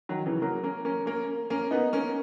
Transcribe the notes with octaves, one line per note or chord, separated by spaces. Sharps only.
D#3 F#3
C#3 E3
F#3 A#3
A#3 C#4
A#3 C#4
A#3 C#4
A#3 C#4
B3 D#4
A#3 C#4